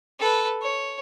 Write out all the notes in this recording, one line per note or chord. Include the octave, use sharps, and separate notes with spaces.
A4 B4
C#5